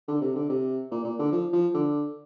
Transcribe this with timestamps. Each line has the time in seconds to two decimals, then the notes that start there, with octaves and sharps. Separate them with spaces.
0.08 D3
0.21 C3
0.36 D3
0.49 C3
0.92 A#2
1.04 A#2
1.19 D3
1.32 F3
1.53 F3
1.74 D3